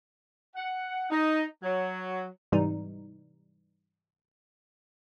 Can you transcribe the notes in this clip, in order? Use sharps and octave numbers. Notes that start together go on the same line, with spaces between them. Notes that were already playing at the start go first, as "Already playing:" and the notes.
F#5
D#4
F#3
G#2 C3 E3 G3 D#4